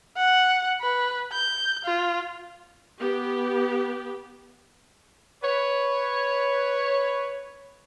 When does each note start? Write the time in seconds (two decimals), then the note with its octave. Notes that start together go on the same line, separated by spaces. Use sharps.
0.17 F#5
0.80 B4
1.32 G6
1.85 F4
2.98 B3 G4
5.43 B4 C#5